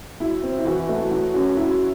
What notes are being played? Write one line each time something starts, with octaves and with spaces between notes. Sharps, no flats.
F#3 E4
C4
E4
E3 F#4
A3
F#3 F#4
C#4 F#4
F#3 E4